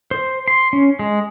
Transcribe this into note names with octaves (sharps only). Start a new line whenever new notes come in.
C5
C6
C#4
G#3